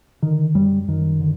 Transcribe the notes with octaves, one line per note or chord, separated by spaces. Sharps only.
D3 D#3
F#2 G3
F#2 D#3
D3